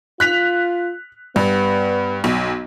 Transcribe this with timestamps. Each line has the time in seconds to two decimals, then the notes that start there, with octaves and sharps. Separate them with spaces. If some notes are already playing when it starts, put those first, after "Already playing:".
0.20 F4 F#6 B6 F7
1.36 G2 B3
2.24 B1